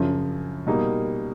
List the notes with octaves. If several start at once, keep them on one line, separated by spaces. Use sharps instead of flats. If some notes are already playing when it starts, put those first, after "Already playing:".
Already playing: F#2 C#3 F3
B2 G3 A#3 D#4